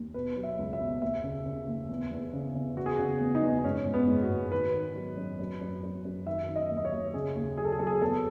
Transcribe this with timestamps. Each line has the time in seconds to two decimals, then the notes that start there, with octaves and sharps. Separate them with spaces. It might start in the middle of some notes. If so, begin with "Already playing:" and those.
Already playing: D#2
0.14 B2 B4
0.36 F#3
0.43 E5
0.58 C#2
0.73 E5
0.80 B2
1.01 D#2 E5
1.24 C#3
1.46 C#3
1.68 D#2
1.89 E2
2.11 E2
2.33 C#3
2.55 C#3
2.77 E2 F#4
2.86 G#4
2.96 F#4
2.99 C#3
3.21 E2
3.35 D#4
3.42 E2
3.58 D#4
3.64 G#2 C#4
3.86 G#2
3.94 B3
4.08 G#2
4.22 F#4
4.30 G#2
4.52 D#3 B4
4.74 D#3
4.96 F#3
5.17 F#2
5.39 F#2
5.61 F#2
5.83 F#2
6.05 F#2
6.26 D#3 E5
6.48 D#3
6.56 D#5
6.70 D#2
6.77 D#5
6.85 C#5
6.92 D#2
7.14 C#3 G#4
7.36 D#2
7.57 F#3 G#4
7.65 A4
7.72 G#4
7.79 F#3 A4
7.87 G#4
8.01 E2 A4